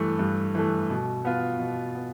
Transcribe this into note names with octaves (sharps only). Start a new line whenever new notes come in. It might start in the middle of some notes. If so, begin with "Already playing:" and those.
Already playing: G2 E3 A3
G2
E3 A3
B2
B3 F4
B2
B3